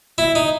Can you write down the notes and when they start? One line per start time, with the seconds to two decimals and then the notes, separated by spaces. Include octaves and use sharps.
0.18 E4
0.35 D#4